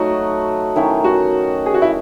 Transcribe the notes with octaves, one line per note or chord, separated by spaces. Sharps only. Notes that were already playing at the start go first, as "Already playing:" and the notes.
Already playing: F#3 A3 D#4 F#4
D#3 F#3 C#4 E4
F#4
G#4
F#4
E4